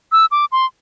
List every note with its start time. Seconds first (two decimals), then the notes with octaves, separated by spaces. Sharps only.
0.12 E6
0.31 D6
0.52 C6